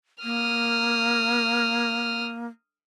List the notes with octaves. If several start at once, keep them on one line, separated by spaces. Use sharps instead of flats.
A#3 D#6 F6